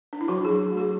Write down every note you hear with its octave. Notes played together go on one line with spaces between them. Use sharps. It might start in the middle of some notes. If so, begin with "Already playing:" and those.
D4
E4
F#3 F#4
G#4
F#3
A3
G#4